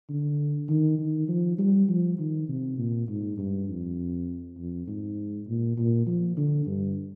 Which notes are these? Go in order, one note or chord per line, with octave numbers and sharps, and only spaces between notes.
D3
D#3
D#3
F3
G3
F3
D#3
C3
A#2
G#2
G2
F2
F2
G#2
A#2
A#2
F3
D3
G2